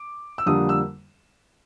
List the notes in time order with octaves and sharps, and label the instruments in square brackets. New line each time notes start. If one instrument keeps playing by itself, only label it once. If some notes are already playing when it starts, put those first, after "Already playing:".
Already playing: [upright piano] D6
E6
F2 D3 G3 A#3 D4 D#6
E6